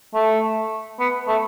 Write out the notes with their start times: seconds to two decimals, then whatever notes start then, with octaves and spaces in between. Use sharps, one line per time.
0.15 A3
1.00 B3
1.28 A3